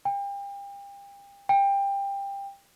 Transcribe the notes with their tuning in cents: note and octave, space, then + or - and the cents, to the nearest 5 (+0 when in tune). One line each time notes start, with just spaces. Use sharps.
G5 +35
G5 +20